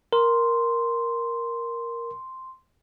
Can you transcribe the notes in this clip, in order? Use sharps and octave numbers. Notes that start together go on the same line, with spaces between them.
A#4 C6